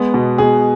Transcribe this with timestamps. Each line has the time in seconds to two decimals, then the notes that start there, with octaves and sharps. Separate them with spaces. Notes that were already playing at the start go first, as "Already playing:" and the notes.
Already playing: G#3 B3
0.14 B2
0.38 B2 G#4